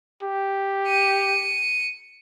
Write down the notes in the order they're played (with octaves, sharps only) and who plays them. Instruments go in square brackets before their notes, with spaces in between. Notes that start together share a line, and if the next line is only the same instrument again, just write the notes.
[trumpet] G4
[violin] C#7 D#7